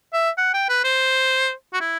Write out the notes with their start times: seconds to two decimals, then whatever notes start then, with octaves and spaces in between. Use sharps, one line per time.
0.14 E5
0.38 F#5
0.54 G5
0.69 B4
0.84 C5
1.73 F#4
1.81 E4